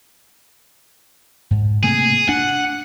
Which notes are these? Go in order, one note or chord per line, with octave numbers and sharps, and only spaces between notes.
G#2
C3 A3 A#3 G#4
D4 F#5